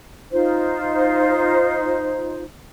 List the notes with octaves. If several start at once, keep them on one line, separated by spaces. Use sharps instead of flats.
D#4 F4 C5